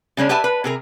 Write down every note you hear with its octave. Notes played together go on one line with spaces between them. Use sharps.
C#3 G#3 C#4 D4
G4 B4 E5 G#5 A5
B4
C3 G#4 A#4